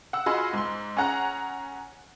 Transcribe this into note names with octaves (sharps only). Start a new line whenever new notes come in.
F#5 E6
F4 F#4 G#4 D#5 B5 C6
G#2 C6
C#4 G#4 F#5 A#5 F#6